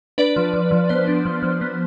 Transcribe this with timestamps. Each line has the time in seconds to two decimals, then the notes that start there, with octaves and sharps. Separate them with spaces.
0.18 D4 B4 D5
0.36 F3
0.54 F3
0.71 F3
0.89 B3 C5
1.08 D4
1.25 F3
1.43 F3
1.61 B3